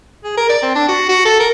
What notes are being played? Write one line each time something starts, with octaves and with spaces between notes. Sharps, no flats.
G#4
A#4
D5
C4
D4
F#4
F#4
A4
A#4